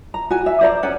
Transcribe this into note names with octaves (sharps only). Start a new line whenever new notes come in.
A#5
F#4 G#5
E5
C5 D5 A#5
C#4 D5 F#5